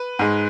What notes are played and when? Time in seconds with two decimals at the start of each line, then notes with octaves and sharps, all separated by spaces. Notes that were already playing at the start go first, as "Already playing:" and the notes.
Already playing: B4
0.19 G#2 G#3